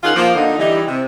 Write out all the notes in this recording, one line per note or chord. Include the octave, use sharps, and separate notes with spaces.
D#3 C#4 F4 G#4 A#4 F#5
F3 A#3
D3 D#4
E3 G3 D#4
C3